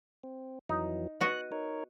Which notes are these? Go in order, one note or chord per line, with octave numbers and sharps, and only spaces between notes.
C4
F2 E3 F#3 D#4
B3 F#4 D#5 F#6
D#4 A#4 C#5